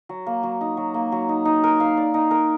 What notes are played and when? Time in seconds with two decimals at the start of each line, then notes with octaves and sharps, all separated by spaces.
0.09 F#3
0.26 A#3
0.43 F#3
0.61 D#4
0.77 F#3
0.94 A#3
1.12 F#3
1.29 D#4
1.45 D#4
1.64 A#4
1.80 F5
1.97 D5
2.14 D#4
2.31 A#4